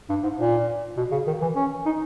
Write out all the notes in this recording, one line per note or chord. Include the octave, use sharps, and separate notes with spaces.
G2
G#2
A#2
B2
C#3
D#3
E3
C#4
D#4